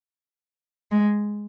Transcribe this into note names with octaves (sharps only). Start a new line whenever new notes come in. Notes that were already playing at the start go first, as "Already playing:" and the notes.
G#3